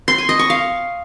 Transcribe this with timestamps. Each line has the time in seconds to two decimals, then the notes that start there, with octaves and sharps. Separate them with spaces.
0.08 C6
0.18 G#5
0.29 D#5
0.39 C#6
0.50 F5